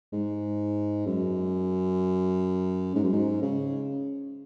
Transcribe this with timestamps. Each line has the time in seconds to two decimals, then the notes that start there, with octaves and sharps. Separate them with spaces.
0.13 G#2
1.07 F#2
2.95 G#2
3.04 F#2
3.13 G#2
3.42 C#3